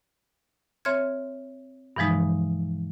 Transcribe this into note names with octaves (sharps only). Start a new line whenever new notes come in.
C4 C#5 E5 C6 F6 G#6
G2 B2 E3 F3 G#3 D#4